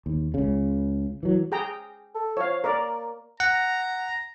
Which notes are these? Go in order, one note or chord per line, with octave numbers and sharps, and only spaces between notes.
D#2
C#2 C#3
E3 F#3
G#4 G5 A#5
A4
F3 C#5 F5
A#3 A#4 D5
F#5 A#5